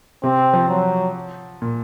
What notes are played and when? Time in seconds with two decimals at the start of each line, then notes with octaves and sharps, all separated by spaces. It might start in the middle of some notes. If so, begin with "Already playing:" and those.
0.23 C3 C4
0.54 F3
0.69 F#3
1.62 A#2